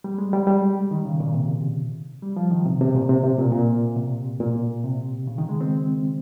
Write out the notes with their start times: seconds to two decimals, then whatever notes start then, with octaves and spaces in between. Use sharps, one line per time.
0.04 G3
0.18 G#3
0.33 G3
0.47 G3
0.91 D#3
1.05 C#3
1.20 A#2
1.34 C3
2.22 G3
2.36 F3
2.51 D#3
2.66 C3
2.81 C3
2.94 A#2
3.10 C3
3.24 C3
3.38 A#2
3.52 A#2
3.96 C3
4.40 A#2
4.84 C3
5.27 C#3
5.38 D#3
5.49 G#3
5.61 C4